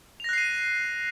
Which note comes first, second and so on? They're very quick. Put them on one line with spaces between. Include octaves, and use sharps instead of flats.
F7 A#6 F#6 C7 D#7